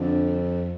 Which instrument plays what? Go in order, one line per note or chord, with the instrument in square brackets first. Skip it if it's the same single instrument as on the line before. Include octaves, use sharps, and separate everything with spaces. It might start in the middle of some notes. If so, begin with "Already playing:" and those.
Already playing: [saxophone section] F2 D3